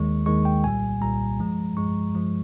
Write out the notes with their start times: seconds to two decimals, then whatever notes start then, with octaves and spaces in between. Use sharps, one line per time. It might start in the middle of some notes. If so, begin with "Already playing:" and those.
Already playing: D#2 D#3 G#3 C#6
0.26 D#2 D#3 G#3 C#6
0.45 G5
0.64 C2 A#2 G3 G#5
1.01 C2 A#2 G3 A#5
1.39 G2 F3 G#3
1.77 G2 F3 G#3 C#6
2.15 G2 F3 G#3